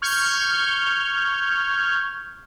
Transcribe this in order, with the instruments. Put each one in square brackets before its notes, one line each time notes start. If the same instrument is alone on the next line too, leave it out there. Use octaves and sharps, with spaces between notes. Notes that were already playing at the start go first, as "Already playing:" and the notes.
[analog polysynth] C#6 F6 G6 G#6